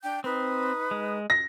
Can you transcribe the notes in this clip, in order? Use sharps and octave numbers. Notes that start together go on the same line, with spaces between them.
D4 G5 G6
C4 D#4 B4 D#6
G#3
A#6